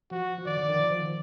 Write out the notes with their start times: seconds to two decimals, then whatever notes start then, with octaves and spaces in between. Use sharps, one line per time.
0.11 F3 F#4
0.38 F3
0.46 D#3 D5
0.57 D3
0.69 D#3
0.79 F3
0.91 F3
1.03 D#3